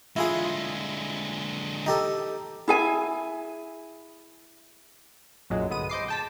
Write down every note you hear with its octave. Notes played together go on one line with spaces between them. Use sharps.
D3 G#3 E4 F4 G#4
D#4 G4 A4
E4 G#4 G#5
B1 F#2 A#2 F#3 G#3
G1 G#3 B3 D#6 D#7
C5 D#5 D6 C7
G5 A5 B6